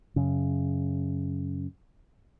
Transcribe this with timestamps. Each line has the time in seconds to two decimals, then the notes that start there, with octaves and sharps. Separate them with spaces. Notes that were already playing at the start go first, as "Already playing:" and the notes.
0.16 F#2 C#3